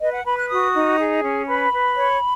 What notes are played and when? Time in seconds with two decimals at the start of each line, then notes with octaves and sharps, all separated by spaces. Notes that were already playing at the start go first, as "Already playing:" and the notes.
0.01 B4 D#5
0.13 F#5
0.25 B4 B5
0.38 F#6
0.50 F#4 D#6
0.75 D#4
0.99 G#4
1.23 C#4
1.47 B4 B5
1.73 B4
1.97 C#5